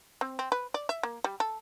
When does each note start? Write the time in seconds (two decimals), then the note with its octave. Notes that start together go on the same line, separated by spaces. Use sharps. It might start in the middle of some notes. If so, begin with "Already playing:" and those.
0.21 C4
0.39 C4
0.52 B4
0.74 D5
0.89 E5
1.03 A#3
1.24 G3
1.40 A4